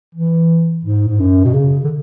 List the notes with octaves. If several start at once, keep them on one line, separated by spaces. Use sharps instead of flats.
E3
G#2
G#2
F#2
B2
C#3
D3